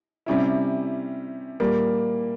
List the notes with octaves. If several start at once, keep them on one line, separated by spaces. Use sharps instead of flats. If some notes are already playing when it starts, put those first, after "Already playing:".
C3 G3 C#4 E4
A#2 G3 A#3